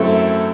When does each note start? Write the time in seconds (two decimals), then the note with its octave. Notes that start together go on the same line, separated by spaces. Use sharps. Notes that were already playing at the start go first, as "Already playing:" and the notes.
Already playing: F#2 F#3 A3 C4 E4 A4